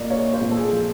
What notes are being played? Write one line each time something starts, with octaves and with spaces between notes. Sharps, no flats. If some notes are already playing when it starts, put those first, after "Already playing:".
Already playing: A#2 A#3 D5 D#5
A#3 C#5
C5
A#2
A4
G#4
F3